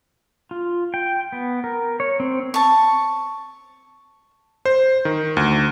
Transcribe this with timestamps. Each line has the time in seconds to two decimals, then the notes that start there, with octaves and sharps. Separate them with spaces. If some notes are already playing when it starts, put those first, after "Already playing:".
0.51 F4
0.94 G5
1.32 B3
1.64 A#4
2.00 C#5
2.20 C4
2.54 A5 C#6
4.65 C5
5.05 D#3
5.37 D2